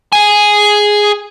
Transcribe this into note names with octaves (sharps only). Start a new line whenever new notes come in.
G#4 G#5